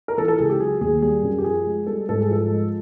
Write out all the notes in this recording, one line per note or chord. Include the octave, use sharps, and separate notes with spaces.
A#4
E3 A4
A4
C#2 G#4
G4
F#3 G#4
D#2 G#4
G3 G#4
F#2
G4
F3 G#4
G#3
G3 A4
G#2 A4
G#4
F3 A4
G#3